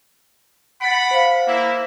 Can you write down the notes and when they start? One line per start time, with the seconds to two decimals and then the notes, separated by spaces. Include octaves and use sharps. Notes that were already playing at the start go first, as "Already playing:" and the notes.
0.81 F#5 B5 A6 D7
1.11 C5 F5
1.48 A#3 E4